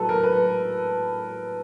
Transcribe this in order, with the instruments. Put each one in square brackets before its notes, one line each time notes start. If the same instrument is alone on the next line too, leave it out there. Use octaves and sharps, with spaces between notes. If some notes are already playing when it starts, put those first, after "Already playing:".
Already playing: [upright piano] A2 F#3 A4 B4
A#4
B4